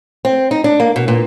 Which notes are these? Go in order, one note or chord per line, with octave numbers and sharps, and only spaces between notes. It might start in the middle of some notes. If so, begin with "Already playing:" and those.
C4
D#4
D4
A#3
B2
A#2